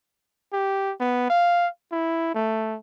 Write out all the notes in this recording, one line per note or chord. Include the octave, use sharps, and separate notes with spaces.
G4
B3
F5
E4
A3